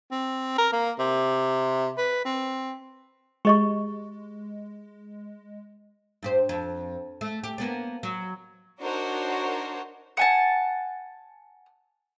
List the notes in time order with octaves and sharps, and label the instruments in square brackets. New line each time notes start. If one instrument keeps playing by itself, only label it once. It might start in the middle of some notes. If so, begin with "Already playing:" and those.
[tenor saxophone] C4
A#4
A#3
C3
B4
C4
[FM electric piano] G#3 [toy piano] G4 D#5 C#6
[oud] G2 G4 C5
F2
A3
G4
A#3 B3 D4
F#3
[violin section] D4 D#4 F#4 A#4 C5 C#5
[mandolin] F#5 G#5 A5